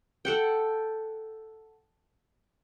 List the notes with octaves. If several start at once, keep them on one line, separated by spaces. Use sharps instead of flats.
A4 F#5 G5